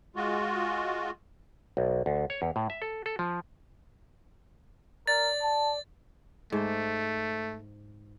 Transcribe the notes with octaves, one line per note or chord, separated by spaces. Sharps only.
G#3 F4 F#4
B1
D2
C#5
E2
A2
E5
A4
A4
F3
A#4 D5 A6
A5
G#2 A3 C5